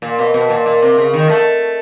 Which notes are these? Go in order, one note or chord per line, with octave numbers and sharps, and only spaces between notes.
A#2
B2
B2
A#2
A#2
C3
C#3
D#3
A3